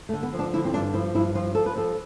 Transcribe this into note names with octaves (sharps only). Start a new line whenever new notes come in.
A3
D3
B3
F3
D4
D3 E4
C4
G2 D4
F3 E4
G2 E4
F3 F4
F3 A4
B4
F3 A4